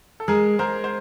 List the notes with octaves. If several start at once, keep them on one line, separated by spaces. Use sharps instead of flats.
A4
G#3 G#4 A#4
G#3 A#4 C5
C5